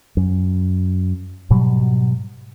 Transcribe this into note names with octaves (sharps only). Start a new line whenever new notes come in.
F#2
G#2 B2 F#3 G3